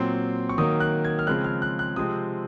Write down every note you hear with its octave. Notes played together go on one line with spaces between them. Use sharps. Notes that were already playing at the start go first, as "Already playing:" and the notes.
Already playing: A#2 F#3 C4 C6
C#6
D#3 F#3 A#3 D#6
F#6
G#6
F6
C#3 F3 G#3 C4 F#6
F6
F#6
F#6
C3 F3 G#3 C4 D#6